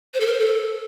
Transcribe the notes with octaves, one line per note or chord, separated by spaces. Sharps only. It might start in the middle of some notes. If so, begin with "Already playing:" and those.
C5
A4
A#4
C5
A4